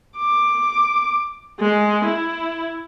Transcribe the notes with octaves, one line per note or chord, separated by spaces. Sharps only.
D6
G#3
E4